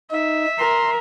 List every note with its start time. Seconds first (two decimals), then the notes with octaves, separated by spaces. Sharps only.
0.11 D#4 E5
0.59 A#4 C6